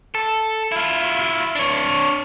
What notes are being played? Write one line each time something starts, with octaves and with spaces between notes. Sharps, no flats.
A4
E4 F4
D4 C#5